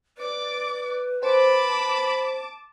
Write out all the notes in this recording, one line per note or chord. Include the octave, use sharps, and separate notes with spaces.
B4 D5 D6
C5 A5 B5 D6